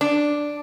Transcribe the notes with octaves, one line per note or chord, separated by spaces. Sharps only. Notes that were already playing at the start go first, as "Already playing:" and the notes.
D4